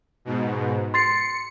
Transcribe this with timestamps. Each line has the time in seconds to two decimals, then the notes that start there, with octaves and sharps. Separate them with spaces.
0.25 G#2 B2
0.94 C6 A6 C7 C#7